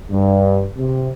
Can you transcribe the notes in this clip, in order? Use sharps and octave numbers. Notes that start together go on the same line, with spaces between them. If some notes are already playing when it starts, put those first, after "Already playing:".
G2
C3